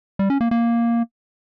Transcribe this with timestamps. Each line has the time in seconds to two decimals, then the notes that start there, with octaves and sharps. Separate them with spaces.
0.19 G3
0.30 C#4
0.41 A#3
0.51 A#3